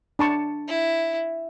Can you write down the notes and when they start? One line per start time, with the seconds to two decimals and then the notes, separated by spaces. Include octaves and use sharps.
0.19 D4 A5 C#6
0.68 E4